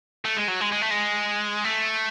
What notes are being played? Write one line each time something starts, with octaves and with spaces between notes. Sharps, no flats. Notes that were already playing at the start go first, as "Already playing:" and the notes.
A3
G#3
F#3
G#3
G#3
A3
G#3
A3